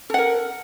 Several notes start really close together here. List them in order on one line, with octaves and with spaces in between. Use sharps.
A4 F#5 A#4